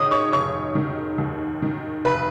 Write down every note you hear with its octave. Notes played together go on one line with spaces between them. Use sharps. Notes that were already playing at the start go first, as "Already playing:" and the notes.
Already playing: D#3 G#3 C#5 D#5 D#6
C#5 C#6
F1 C#5 C#6
D#3
D#2
D#3
F1 B4 B5